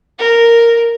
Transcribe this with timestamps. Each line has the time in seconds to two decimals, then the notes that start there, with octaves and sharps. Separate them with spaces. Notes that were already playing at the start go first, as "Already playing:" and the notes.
0.19 A#4